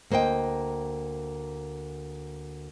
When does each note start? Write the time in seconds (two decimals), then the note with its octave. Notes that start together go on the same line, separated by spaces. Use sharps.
0.11 D2 A#3 C5 D#5 G5